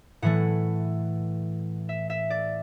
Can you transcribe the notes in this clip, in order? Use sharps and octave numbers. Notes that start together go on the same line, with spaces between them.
A2 E3 A3 F#5
E5
E5
D5